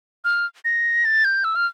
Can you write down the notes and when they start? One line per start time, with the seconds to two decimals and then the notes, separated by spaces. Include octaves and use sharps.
0.25 F6
0.65 A#6
1.05 A6
1.25 G6
1.44 E6
1.56 F6